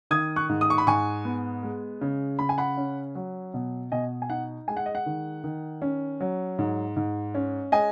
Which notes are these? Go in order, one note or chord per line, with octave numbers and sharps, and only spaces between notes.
D#3 D#6 G#6
C#6 F#6
G#2
D#6
C#6
B5
G#2 G#5 C#6
B3
G#3
C#3
C#3 B5
G#5
F#5 B5
C#4
F#3
B2
B2 D#5 G#5
G#5
D#4 F#5
G#3 G#5
F#5
D#5
F#5
D#3
D#3
C#4
F#3
G#2
G#2
C#4
G#3 D#5 G#5